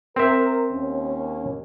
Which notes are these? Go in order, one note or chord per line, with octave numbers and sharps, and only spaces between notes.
C4 A#4 E5
D#2 C#4